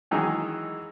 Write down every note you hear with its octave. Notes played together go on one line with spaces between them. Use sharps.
D#3 E3 F#3 G#3 D#4 G#4